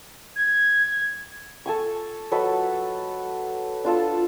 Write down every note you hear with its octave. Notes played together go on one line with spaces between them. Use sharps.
G#6
A4 G#5 C#6
F#3 A4 B4 D#5
D4 F4 A4